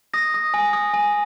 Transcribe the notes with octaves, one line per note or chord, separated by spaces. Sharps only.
D#6 A#6
D#6
G#5
D#6
G#5